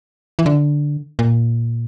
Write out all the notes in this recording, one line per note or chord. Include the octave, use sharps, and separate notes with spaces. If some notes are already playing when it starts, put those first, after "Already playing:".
E3
D3
A#2